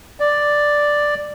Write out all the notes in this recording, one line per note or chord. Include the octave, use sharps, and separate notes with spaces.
D5